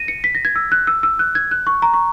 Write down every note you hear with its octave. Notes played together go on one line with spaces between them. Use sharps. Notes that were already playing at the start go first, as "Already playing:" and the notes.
Already playing: A#6 D#7
C#7
B6
A#6
G#6
E6
F#6
E6
E6
F#6
G#6
F#6
C#6
A#5
C#6